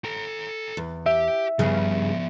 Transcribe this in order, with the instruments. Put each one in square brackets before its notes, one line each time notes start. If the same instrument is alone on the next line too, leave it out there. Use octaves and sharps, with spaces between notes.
[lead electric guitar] A4 A#5
[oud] E2
[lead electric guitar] G4 [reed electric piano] E5
[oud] G2 C#3 G#4 [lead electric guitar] F3 B3